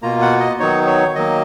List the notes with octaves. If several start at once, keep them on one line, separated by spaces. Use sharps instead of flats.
B2 A#3 F4 A#5
F#5
D#5
D#3 F#3 B3 D#4 C#5
C#5
D#3 F#3 A#3 D#5